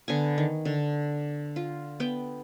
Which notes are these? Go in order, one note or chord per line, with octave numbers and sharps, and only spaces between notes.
D3 B3 G#5
D#3
D3
F4
B3 G5